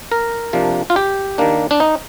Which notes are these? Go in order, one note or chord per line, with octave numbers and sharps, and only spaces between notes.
A#4
C3 F3 A#3 D4
F4
G4
D#3 A#3 D4
D4
D#4